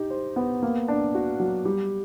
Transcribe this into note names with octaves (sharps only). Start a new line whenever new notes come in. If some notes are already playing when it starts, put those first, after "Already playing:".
Already playing: D#4 G4
C5
B3
A#3
D4
F#4
F#3
G3